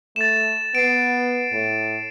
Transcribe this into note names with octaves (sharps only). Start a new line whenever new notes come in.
A3 A6 E7
B3 C7 D7
A2